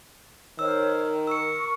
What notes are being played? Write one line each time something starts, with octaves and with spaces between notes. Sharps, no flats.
D#3 C5 C#5 E6 F6
A#4 C#6 E6 C#7